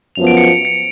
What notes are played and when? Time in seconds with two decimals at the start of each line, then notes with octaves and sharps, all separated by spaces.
0.15 F#2 F3 B3 F7
0.27 D7
0.37 C#7
0.48 D7
0.65 C#7